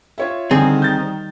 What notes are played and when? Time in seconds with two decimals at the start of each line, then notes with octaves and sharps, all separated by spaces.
0.18 F4 C#5 E5
0.51 D3 D#3 G3 C4 G#4
0.82 G6 A6